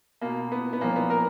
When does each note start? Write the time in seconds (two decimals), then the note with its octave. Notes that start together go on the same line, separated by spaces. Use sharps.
0.21 B2 A#3
0.52 B3
0.73 B3
0.81 A#2 F3 A#3
0.96 B3
1.10 A#4